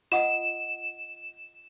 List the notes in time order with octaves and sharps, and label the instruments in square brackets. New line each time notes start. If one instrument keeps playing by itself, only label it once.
[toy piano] F4 F#5 D#6 [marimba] D#5 [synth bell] E7